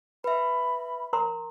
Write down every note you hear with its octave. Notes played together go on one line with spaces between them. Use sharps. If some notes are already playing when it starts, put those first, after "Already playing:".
B4 E5 B5
A#4 A#5 C6